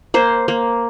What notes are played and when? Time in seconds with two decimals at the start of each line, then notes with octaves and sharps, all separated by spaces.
0.14 A#3 C5
0.48 A#3